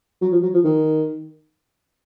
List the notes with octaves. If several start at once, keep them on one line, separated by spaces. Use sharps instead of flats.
F#3
F3
F#3
F3
D#3